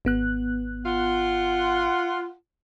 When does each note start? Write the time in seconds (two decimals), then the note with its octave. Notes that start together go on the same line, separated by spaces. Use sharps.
0.05 G#1 B3 F#6
0.85 F4 F#5